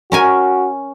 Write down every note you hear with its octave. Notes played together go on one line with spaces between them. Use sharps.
C#4 F#4 A#4 G#5